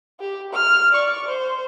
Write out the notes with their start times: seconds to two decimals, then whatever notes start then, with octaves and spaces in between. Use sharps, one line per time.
0.20 G4
0.53 F6
0.91 D5 C#6
1.27 C5